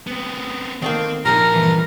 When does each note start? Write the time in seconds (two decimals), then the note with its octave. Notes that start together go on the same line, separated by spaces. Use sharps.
0.07 B3 C4
0.82 D#3 A3 A#3 C4
1.25 A#2 F3 D#4 A#4 G#5 A#5
1.54 G2 E3 B4